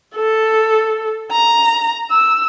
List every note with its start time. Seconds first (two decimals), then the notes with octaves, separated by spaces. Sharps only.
0.16 A4
1.32 A#5
2.11 E6